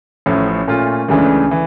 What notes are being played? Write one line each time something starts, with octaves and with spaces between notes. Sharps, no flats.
A1 A2 F3 C#4
A#2 A3 C#4 F4
C#2 C#3 E3 A3 D4
E3